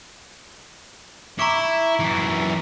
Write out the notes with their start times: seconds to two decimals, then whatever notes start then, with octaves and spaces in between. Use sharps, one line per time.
1.39 E4 A#5 C#6 D6
2.00 F#2 E3